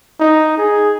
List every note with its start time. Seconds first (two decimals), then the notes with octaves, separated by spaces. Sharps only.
0.20 D#4
0.57 G#4